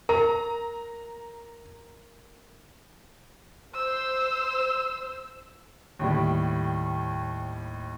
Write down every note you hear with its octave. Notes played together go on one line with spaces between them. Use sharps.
A#4 A#5
C5 E6
D#2 A2 G3